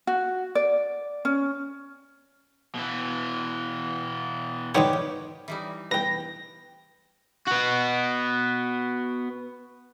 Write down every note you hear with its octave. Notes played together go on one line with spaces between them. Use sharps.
F#4
D5
C#4
B2 E3
G#2 D#3 B3 G4 C#5 F#5
E3 G3 D#4
E2 G2 B4 G5 A#6
B3 F#4